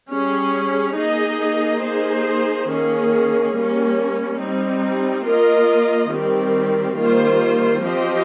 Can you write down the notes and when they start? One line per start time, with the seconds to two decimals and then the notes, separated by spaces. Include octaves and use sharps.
0.10 G3 C#4 G#4
0.95 A#3 D#4 G#4 D#5
1.81 A#3 D#4 G#4 C5
2.67 D#3 A#3 C#4 G#4
3.53 G3 A#3 C#4
4.39 G3 C4 D#4
5.25 A#3 F4 A#4 D#5
6.10 D#3 G3 C4 G4
6.97 D#3 G3 A#3 F4 C5
7.83 F3 C4 G4 C5 D#5